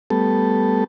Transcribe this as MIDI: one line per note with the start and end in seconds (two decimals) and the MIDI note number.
0.10 0.84 55
0.10 0.84 57
0.10 0.84 59
0.10 0.84 69